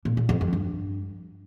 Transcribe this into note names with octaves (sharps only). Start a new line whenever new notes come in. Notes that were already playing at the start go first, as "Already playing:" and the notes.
A#2
A#2
F2
F2
G2